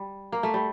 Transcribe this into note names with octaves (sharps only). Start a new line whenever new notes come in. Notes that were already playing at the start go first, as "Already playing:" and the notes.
Already playing: G3
A#3
A3
G3